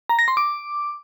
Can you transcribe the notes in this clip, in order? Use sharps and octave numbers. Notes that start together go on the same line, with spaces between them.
A#5
A#6
C6
D6